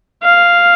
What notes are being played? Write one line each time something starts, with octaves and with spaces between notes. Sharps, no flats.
F5